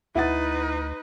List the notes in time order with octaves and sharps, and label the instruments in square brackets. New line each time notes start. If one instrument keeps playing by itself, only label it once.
[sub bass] D2 [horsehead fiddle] D#4 B4 [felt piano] E4 F#5 A6